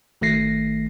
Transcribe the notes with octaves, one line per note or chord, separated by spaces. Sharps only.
G#1 D#3 A3 A#6 C7